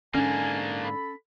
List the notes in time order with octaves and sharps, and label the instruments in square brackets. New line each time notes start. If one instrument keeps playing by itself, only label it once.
[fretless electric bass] G#2 D3 [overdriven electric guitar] A#3 D4 [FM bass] C#4 [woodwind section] G#5
[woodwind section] A4 B5